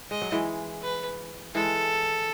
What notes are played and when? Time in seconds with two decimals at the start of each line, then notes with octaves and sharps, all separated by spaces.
0.11 G#3 D#5
0.22 F#3
0.32 E3 G#3
0.83 B4
1.55 E3 G#3 A4